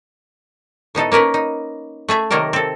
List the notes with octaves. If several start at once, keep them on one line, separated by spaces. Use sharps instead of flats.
A2 B3 D#4 A4
A#3 C#4 A#4 B4
D#4
A3 G#4 E5
C3 D#3 F#3 A#3 A4 A#4
C4 A4